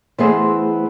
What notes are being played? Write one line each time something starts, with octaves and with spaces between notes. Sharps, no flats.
E3 A3 B3 C4 G#4 C5